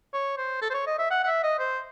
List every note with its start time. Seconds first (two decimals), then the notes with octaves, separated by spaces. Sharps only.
0.13 C#5
0.37 C5
0.62 A4
0.70 C5
0.74 C#5
0.87 D#5
0.99 E5
1.11 F#5
1.23 F#5
1.26 E5
1.43 D#5
1.59 C5